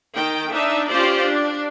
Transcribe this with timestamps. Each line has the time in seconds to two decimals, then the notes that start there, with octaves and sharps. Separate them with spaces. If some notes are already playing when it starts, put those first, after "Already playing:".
0.15 D#3 G5
0.53 D4 D#4 E5
0.89 C#4 F4 G4 C5 D5
1.27 D4